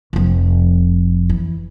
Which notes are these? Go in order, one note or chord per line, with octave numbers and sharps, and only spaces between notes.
F1 F2
E3